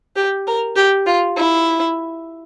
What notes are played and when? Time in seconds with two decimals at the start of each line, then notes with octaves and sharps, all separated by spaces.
0.16 G4
0.47 A#4
0.76 G4
1.06 F4
1.37 E4